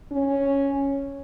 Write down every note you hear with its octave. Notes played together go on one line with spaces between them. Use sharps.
C#4